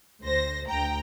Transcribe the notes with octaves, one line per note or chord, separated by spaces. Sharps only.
D2 C5 A#6
D2 G5 A#5